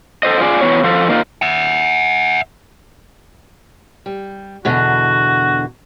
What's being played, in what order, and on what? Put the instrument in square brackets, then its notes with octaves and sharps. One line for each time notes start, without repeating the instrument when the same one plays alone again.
[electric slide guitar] A4 C5 D#5
F4 G#4 D5
E3 F#3 B3 C#5
F3 F4 A4
A#3 D#4 F4
[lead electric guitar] E5 F#5
[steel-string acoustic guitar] G3
[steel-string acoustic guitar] E2 B2 D3 [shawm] F#4